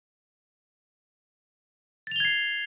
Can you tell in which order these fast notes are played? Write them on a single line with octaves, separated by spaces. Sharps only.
A6 F7 G7 G#6 C7